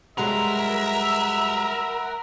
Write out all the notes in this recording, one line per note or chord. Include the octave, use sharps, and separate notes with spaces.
G2 F#3 G#3 A#4 E5 F#5 B5